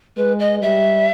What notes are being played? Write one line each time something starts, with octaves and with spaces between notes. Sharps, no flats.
G#3 B4
D#5
G3 E5